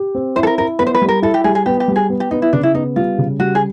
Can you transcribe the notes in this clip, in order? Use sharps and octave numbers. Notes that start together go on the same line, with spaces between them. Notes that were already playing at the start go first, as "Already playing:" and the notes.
Already playing: G4
C4
E4 C5
A4
A#4
E4 A#4
B3 B4
C5
B4
G3
A#4
E4 A4
G4
G3 G#4
G#4
B3 G4
G4
G3
G#4
B3
G4
B3 D#4
E4
C#3 D4
E4
B3 D#4
G3 F4
C#3
G3 F#4
G#4